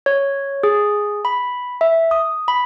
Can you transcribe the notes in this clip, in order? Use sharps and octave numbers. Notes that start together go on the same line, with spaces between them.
C#5
G#4
B5
E5
D#6
B5